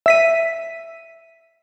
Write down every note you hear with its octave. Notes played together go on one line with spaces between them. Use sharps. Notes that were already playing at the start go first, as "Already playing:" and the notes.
E5 B6 D#7